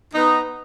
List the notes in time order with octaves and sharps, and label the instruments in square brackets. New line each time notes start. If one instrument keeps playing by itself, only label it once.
[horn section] B3 D#4